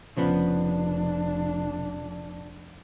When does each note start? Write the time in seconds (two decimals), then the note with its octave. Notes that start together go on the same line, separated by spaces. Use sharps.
0.17 F1 C#3 F3 B3 D4